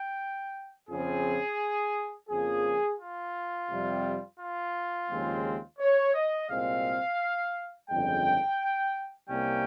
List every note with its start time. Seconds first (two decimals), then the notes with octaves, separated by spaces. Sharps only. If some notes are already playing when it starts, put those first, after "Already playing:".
Already playing: G5
0.89 F2 C#3 F3 C4 G#4
2.29 F2 C#3 F3 A#3 G#4
3.00 F4
3.69 F2 C3 G3
4.39 F4
5.09 D#2 C#3 F3 G#3 C4
5.79 C#5
6.15 D#5
6.49 C2 A#2 G#3 C4 F5
7.89 G1 F2 C#3 G#3 G5
9.29 C2 C3 G3 A#3 C#4 G5